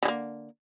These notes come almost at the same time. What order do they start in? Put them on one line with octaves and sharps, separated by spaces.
D3 G#3 A#3